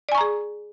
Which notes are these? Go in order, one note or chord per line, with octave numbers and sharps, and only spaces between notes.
G#4 D5 G#5 A#5 C#6